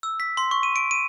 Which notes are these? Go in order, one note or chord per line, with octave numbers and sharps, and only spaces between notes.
E6
B6
C6
C#6
D#7
D7
D#7